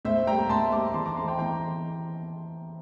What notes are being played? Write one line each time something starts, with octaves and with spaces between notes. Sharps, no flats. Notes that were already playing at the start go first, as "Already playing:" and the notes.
A2 C5 E5
G3 A#3 G5 A#5
A2 A5 C6
G3 A#3 A#5 D6
E3 A5 C6
A#5 D6
A3 C4 A5 C6
G5 A#5
E3 G5 A#5